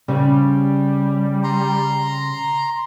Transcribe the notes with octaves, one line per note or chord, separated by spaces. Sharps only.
C#3 G3 C4
A#5 C6